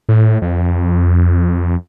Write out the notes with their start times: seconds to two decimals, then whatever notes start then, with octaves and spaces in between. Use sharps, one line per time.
0.09 A2
0.42 F2